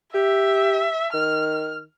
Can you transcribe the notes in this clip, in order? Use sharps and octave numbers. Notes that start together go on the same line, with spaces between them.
G4 E5
D#3 F6